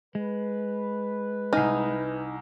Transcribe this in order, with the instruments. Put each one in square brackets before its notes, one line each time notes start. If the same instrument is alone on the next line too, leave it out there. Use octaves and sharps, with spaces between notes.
[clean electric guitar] G#3 [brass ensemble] B4
[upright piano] C2 G#5 F6 [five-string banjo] D#4